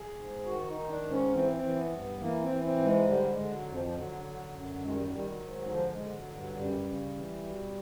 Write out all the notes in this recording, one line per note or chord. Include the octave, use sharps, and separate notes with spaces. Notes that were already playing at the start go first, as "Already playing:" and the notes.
Already playing: G#4
G#2
D#3 F#4
D#4
D#3
D4
G#2
C#4
E3 C4
E3
B3
G2
E3 A#3
C4
E3
C4
G#2
G#3
D3 G3
G#3
D3
F#3
F2
F3
F3
D3 F#3
D3
F#2
D#3 G#3
G3
F#3
D#3 G3
F#3
G#2
D3 F3
G#3
D3
F3
F#3
G2
F#3
F#2 G3
C#3
E3
B2